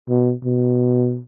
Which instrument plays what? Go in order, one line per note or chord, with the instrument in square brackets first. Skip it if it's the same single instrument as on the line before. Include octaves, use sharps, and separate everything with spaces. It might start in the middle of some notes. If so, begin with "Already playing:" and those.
[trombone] B2
B2